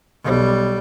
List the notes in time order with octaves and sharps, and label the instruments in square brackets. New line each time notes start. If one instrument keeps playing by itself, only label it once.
[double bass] B1 G3